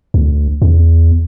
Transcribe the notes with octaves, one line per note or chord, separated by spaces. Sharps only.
D2
E2